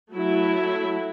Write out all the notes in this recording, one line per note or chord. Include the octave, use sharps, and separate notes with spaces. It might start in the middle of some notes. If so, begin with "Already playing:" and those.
F#3 A3 E4